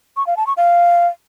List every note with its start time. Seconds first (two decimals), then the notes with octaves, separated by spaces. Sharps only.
0.17 C#6
0.27 F5
0.37 A5
0.47 C#6
0.57 F5